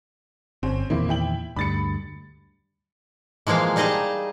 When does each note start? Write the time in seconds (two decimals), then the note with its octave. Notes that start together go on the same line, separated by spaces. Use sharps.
0.63 G1 C4 C#4
0.90 E2 A#2 D#3 A#3 C4 E4
1.09 E4 G5 F#7
1.56 D2 G2 B5 A6 C#7
3.47 E3 F3 G#3 A#3 F5
3.76 G3 D#4 G#4 D#5 A5 A#5